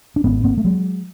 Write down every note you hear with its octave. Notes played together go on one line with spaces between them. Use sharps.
D4
G#1 G#2 B3 C#4
A#3 C4
A3
F#3 G#3